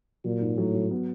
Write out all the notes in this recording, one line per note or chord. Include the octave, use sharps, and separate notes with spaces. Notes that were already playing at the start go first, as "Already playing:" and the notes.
A#2 F#3
G#2
A2 F#3
F#3
B3